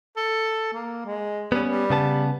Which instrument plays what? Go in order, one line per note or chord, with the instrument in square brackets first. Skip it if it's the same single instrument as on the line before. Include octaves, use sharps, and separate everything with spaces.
[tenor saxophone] A4
A#3
G#3
[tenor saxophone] G3 [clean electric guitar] B3 C#4
[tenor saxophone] G3
[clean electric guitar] C#3 B3 A5